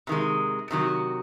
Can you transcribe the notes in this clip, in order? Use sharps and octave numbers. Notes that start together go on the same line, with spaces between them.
C3 D#3 G#3
C3 D#3 F#3